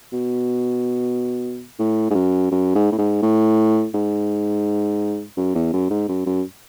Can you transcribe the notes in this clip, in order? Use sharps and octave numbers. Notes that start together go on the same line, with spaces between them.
B2
A2
G#2
F#2
F#2
G#2
A2
G#2
A2
G#2
F#2
E2
F#2
G#2
F#2
F#2